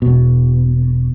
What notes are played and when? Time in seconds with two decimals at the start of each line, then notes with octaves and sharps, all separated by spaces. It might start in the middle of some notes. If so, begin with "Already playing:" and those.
0.02 E1 B2